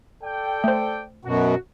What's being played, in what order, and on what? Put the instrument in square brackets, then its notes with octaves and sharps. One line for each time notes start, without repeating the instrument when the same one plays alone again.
[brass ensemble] A4 D5 G5
[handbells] A3 C5
[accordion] F#2 B2 [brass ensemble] F#4